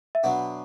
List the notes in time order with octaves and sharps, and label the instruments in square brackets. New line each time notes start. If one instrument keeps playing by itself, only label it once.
[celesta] E5
[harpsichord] B2 F#3 B3 D4 [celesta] F#5